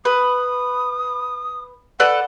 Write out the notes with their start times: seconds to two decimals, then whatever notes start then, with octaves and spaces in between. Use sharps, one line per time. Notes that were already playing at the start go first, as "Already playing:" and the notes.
0.05 B4 D#6
2.00 A4 B4 D5 F#5